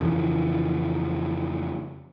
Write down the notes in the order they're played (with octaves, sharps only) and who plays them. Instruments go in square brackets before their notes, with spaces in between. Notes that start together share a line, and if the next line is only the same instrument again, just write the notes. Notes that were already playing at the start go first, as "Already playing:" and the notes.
[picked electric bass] F2 C#3 E3 F3